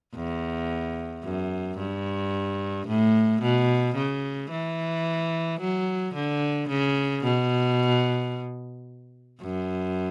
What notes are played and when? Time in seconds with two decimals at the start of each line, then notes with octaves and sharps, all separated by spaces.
0.15 E2
1.24 F#2
1.78 G2
2.88 A2
3.42 B2
3.96 C#3
4.51 E3
5.60 F#3
6.15 D3
6.69 C#3
7.24 B2
9.41 F#2